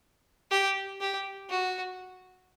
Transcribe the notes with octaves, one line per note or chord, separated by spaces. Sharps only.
G4
G4
F#4